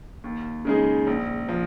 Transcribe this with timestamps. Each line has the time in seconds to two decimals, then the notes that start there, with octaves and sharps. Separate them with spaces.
0.24 D#2
0.65 C#3 G#3 D#4 G#4
1.07 A#1
1.49 F3